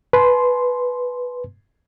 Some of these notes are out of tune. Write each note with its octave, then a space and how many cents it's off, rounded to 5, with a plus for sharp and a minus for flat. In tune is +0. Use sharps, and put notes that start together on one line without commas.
B4 +0 G#5 +45 C6 +0